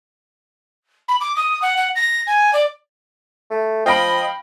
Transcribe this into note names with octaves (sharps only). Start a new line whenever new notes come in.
B5
D6
D#6
F#5
F#5
A#6
G#5
D5
A3
F3 D#5 F5 G5 B5 A#6 D7